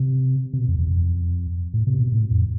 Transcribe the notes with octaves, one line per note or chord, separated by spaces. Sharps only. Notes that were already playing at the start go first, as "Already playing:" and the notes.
Already playing: C3
C3
B2
F2
E2
F2
A2
C3
B2
A2
F2